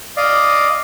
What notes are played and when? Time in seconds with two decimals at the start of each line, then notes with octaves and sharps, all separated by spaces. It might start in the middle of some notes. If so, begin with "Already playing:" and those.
0.17 D5 D#5 F5